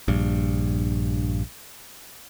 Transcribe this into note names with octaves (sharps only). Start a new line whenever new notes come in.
A#1 G2